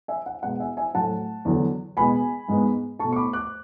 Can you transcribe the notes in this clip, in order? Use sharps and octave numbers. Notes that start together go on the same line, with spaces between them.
E5 G#5
F#5
B2 G#3 B3 F#5
E5 G#5
E5 G#5
A2 F#3 A3 F#5 A5
E2 D3 F#3
B2 G#3 B3 G#5 B5
G#2 G#3 B3
B2 A3 A5 C#6
C#6
B5 D6
D6 F#6